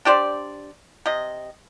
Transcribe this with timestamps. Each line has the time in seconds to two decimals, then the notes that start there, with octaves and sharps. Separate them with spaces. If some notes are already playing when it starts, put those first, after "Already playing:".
0.05 D4 G4 C5 D5
1.06 C3 D#5